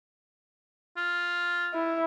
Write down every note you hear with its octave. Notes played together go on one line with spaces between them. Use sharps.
F4
E4